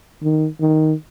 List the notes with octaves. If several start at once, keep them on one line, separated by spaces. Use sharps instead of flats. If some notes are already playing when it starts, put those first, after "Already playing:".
D#3
D#3